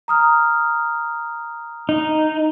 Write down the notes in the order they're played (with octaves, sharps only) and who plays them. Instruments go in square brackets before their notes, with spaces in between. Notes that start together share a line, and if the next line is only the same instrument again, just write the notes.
[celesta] A#5 D#6 F6
[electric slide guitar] D#4